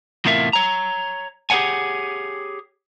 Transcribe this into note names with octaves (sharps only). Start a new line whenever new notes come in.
E2 A2 C3 F4 A#4 E5
C#5 A#5
G4 G#4 B4 C#5 F#5 G#5